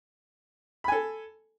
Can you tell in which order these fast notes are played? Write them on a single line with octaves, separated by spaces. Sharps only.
B5 G#5 A4